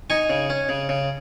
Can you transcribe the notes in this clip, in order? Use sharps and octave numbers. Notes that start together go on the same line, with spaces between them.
D#4 G#5 C#6
C#3
C#4
C#3
C#3